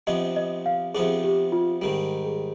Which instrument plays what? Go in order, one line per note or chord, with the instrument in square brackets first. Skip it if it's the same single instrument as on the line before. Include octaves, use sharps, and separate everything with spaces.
[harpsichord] C3 F3 B3 D4 [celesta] D#5
[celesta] D#5
F5
[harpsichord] C3 F3 B3 D4 [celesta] G#4
[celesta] G4
F4
[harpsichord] G#2 D#3 G3
[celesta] G#4